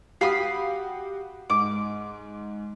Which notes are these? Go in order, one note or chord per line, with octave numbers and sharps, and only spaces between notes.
F#4 G4 F5 B5 D#6
G#2 D6